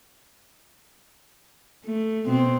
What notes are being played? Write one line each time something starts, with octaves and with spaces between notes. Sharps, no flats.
A3
B2 C4